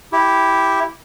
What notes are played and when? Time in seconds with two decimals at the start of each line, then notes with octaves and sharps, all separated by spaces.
0.12 E4 G4